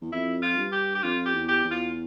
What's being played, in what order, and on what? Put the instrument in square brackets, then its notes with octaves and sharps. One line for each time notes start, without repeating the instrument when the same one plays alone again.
[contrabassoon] E2
[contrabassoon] F2 [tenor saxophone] E4
[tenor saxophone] F4
[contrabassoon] G2
[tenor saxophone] G4
G4
[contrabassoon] F2 [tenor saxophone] F4
[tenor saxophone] G4
[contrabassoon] E2
[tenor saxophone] G4
[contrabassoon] E2
[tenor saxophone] F4